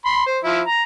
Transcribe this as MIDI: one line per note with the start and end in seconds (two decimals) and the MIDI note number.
0.05 0.25 83
0.05 0.25 84
0.26 0.39 72
0.43 0.61 53
0.43 0.61 64
0.67 0.83 82